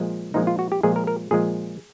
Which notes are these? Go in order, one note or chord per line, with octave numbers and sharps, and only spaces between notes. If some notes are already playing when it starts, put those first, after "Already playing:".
Already playing: A#2 F3 G#3
A#2 F3 G#3 D#4
F4
F#4
G4
A#2 F3 G#3 G#4
A#4
A#4
A#2 F3 G#3 G#4